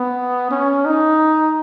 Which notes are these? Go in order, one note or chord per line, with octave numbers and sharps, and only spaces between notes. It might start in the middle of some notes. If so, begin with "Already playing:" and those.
Already playing: B3
C#4
D#4